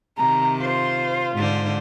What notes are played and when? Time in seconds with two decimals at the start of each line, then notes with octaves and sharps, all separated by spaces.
0.18 C3 D#3 A#5
0.62 F4 C5
1.36 G#2 D3 C5